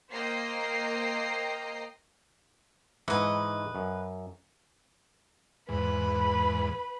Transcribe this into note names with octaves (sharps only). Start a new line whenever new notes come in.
A#3 C5 D#5 G5 A#5 C7
G#2 E3 B4 D#5 F#5
F#2
E2 G#2 B4 B5